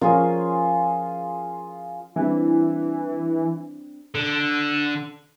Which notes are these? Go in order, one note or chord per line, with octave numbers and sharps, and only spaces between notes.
F3 C#4 F4 G#4 A#4
E3 G3 C4 D4
D3